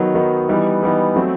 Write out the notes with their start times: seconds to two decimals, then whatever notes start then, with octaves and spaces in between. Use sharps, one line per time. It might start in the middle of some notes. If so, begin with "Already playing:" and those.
Already playing: D#3 F#3 B3 D#4
0.15 D#3 F#3 B3 D#4
0.49 E3 G3 B3 D#4
0.83 E3 G3 B3 D#4
1.16 F#3 A3 C4